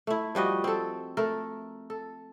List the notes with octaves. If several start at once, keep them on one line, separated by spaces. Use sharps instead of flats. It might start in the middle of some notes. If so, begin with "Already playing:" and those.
A3 E4
F3 G3 F#4 D#5
C4 A4
A3 A4 A#4
A4